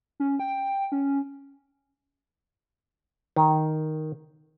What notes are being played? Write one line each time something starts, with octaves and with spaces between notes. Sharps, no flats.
C#4
G5
C#4
D#3